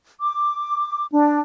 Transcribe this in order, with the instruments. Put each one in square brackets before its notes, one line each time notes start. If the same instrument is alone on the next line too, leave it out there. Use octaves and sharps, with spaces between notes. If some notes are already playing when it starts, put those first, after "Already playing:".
[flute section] D6
D4